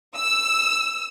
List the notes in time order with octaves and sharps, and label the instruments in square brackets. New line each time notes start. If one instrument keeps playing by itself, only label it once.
[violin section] E6